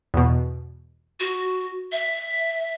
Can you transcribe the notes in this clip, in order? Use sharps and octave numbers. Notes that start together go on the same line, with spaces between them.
E2 B2
F#4
E5